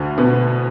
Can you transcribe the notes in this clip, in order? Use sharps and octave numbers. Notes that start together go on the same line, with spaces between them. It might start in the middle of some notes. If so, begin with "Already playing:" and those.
Already playing: D2 D3
B2 B3